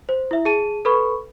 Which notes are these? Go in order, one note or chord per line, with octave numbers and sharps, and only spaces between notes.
C5
E4 E5
G#4 A5 D#7
A4 B4 B5 C#6